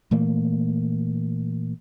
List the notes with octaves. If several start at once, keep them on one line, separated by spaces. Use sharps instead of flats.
A#2 E3 A3 A#3